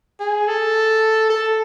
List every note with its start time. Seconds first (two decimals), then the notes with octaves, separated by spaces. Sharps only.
0.20 G#4
0.47 A4
1.30 A4